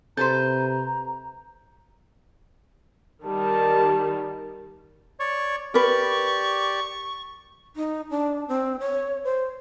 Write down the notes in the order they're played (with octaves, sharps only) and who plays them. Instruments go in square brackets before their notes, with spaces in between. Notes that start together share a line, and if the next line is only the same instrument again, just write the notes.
[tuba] C3 [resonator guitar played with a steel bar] A4 B4 C5 [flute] A#5 [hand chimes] G6
[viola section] D#3 G3 [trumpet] A5
[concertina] C#5 D5 C#6
[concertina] G4 D5 [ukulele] A#4 B4 [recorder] C#6
[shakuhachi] D#4
D4
C4
C#5
C5